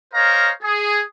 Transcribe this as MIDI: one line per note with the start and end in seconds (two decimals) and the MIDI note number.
0.14 0.51 70
0.14 0.51 72
0.14 0.51 73
0.14 0.51 75
0.14 0.51 77
0.14 0.51 82
0.63 1.02 68